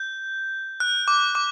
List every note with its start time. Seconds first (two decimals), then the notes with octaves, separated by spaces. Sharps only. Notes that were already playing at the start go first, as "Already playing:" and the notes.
Already playing: G6
0.80 F#6
1.08 D6
1.35 D6